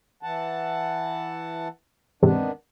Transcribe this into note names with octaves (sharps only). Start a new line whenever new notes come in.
E3 F#5 A5
E2 G#2 C3 D#3 B3 D4